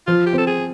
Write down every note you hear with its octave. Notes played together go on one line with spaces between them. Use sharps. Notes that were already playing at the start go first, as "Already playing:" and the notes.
F3 F4
G4
C4 A4
G#4